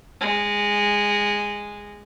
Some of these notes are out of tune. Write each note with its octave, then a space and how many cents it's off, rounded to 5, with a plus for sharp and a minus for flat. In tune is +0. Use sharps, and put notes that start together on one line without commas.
G#3 -15